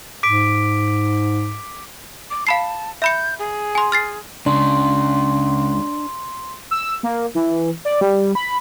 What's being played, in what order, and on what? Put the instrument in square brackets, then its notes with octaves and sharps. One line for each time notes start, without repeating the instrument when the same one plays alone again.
[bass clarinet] G#2 [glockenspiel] D6 B6 D7
[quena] D6
[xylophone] F5 B5 C7 [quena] A5
[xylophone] E5 B5 C#7 [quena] G6
[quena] G#4
[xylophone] G#5 C6
F6 A6 C7
[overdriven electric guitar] C#2 C#3 [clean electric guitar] D4 [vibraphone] C6
[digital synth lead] E6
A#3
E3
D5
G3
B5